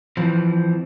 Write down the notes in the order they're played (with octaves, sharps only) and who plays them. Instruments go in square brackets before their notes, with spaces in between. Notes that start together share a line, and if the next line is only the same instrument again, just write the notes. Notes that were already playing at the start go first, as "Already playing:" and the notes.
[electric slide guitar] E3 F3 C4